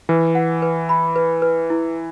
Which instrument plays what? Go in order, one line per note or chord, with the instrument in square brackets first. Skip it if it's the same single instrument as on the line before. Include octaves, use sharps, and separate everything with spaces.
[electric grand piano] E3 [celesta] B4
[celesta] F#5
B4
B5
B4
B4
E4